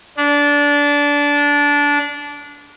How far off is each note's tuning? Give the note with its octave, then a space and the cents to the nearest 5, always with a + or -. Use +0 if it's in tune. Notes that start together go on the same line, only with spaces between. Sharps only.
D4 -20